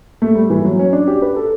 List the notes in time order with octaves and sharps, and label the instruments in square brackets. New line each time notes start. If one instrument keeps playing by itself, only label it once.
[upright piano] A3
G3
E3
F#3
C#4
D4
G4
B4
A4